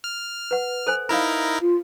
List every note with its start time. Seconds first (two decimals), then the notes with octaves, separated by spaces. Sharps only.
0.04 F6
0.51 B4 F#5
0.87 A4 C5 G#5
1.09 D#4 E4 A#4 F5 B5
1.61 F4